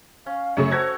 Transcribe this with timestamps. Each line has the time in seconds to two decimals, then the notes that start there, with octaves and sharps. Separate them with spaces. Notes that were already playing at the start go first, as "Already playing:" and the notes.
0.26 C#4 F5
0.57 F#2 C#3 A3 C#5 C#6
0.72 C#4 F#4 A4 C5 G#6 A#6